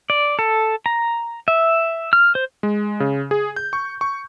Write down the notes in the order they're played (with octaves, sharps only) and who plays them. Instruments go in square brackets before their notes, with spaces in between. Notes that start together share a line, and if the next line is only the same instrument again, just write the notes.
[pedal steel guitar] D5
A4
A#5
E5
F6
C5
[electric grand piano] G#3
C#3
G#4
G6
C#6
C#6